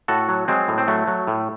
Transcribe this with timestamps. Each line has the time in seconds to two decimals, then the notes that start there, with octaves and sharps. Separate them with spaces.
0.08 A2 F#4 A4
0.29 F#3
0.48 F#3 G#3 C4
0.68 A2
0.78 C4
0.88 F#3 A3
1.07 F#3
1.27 A2